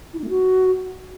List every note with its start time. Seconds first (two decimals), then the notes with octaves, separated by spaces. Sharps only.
0.13 E4
0.19 D#4
0.24 A3
0.29 F#4